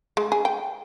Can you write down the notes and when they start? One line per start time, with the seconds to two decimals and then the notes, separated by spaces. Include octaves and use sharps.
0.17 G#3
0.32 G#4
0.45 G5